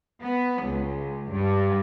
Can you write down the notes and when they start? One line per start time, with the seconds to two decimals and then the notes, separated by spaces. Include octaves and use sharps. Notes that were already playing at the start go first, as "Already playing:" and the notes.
0.20 B3
0.62 C#2
1.30 G2